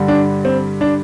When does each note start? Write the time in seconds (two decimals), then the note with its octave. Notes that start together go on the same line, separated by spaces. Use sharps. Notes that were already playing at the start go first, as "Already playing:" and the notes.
Already playing: G2 D3 G3
0.08 D4
0.45 C4
0.81 D4